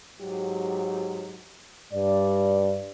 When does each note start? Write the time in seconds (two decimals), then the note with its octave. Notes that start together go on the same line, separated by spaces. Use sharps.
0.21 G#2 F#3 G4
1.93 G2 D5